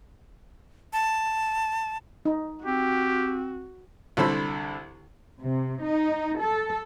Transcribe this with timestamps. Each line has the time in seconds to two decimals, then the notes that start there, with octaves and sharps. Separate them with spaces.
0.93 A5
2.25 D#4
2.66 C4 F#4 G4
4.17 C2 D3 A4 C5 B5 E6
5.40 C3
5.82 D#4
6.40 A4